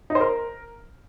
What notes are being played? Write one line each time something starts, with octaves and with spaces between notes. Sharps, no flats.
D#4
C5
A#4